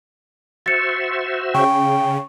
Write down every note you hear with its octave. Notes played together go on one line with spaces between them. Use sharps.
F#4 C5 E5 A6 C#7
C#3 G5 C#6